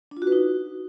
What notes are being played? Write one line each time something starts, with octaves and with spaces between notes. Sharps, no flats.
D4
F4
F#4
B4
D#4